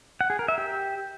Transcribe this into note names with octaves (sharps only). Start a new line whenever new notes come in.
F#5
G#4
A#4
E5
G4